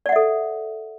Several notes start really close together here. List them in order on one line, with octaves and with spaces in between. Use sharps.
D5 F#5 E5 A4